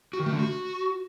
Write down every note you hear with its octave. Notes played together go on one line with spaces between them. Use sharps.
F#4
D#3
A3
D3
F#4